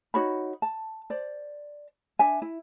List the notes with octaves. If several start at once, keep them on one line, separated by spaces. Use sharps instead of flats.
D#4 F#4 C#5 B5
A5
C5 D5
D4 E5 G#5
E4